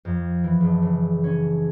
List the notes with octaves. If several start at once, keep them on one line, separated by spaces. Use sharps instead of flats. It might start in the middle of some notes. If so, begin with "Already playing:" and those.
F2
E3
F#1
C#3
C#4